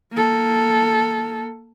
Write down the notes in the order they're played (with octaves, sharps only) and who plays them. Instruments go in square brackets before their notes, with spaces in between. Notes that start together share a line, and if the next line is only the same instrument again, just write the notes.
[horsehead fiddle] A#3 A4